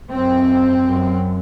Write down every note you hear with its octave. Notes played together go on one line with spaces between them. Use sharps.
F#2 C4
F#2